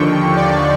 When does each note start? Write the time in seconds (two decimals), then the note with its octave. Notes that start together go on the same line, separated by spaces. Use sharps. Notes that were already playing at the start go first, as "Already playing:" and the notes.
Already playing: D#2 D3 F3 G5 C#6
0.36 D5